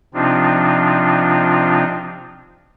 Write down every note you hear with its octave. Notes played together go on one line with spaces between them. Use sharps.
C3 F3 C4 D4 D#4 F4